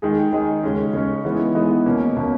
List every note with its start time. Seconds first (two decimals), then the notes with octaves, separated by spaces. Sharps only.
0.02 D#3 G#3 D#4 G#4
0.33 D#3 G#3 D#4 G#4
0.63 C#3 G#3 C#4
0.93 C#3 G#3 C#4
1.24 E3 G#3 B3 D#4
1.55 E3 G#3 B3 D#4
1.86 B2 A#3 C#4
2.17 B2 A#3 C#4